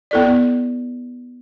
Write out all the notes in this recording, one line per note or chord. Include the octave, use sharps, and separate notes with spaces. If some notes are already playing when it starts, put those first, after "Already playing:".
B3 E4 A4 D5